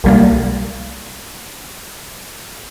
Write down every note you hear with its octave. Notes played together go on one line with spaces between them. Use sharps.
C2 G3 A#3